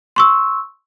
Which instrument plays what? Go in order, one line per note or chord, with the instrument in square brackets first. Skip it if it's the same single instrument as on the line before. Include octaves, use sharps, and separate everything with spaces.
[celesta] C6 C#6 E6